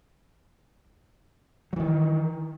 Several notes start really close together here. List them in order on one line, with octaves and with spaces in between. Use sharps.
F#3 E3 D#3